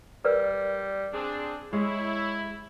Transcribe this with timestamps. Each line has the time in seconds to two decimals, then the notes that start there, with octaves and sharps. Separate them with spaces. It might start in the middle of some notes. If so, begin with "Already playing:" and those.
0.25 G3 A#4 B4 D5
1.13 C4 D4 G#4
1.73 G#3 E4 C#5